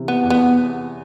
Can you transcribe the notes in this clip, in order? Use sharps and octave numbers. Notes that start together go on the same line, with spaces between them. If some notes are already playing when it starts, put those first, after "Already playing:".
Already playing: C3 E3
B3
E2
B3